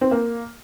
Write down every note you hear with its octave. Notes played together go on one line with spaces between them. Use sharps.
C4
A#3